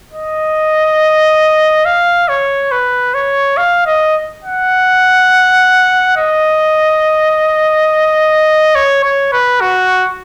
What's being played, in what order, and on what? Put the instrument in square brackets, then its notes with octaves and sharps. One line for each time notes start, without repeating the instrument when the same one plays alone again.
[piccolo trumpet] D#5
F5
C#5
B4
C#5
F5
D#5
F#5
D#5
C#5
C#5
B4
F#4